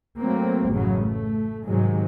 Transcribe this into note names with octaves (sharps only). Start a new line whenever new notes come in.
F#3 A3 A#3 C4
A1 F#2 C#3 F#3
A3
G#2 C3 D#3 F#3 G#3